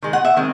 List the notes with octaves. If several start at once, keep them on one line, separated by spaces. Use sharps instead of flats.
D#3 G#3
F#5
E5
D#3 G#3 C4